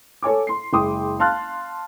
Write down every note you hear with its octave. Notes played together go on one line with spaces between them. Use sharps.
A4 C#5 G#5 D6
C6 C7
F#1 G#3 G5 C6 D6 D#6
F5 A5 C6 F6 F#6 A6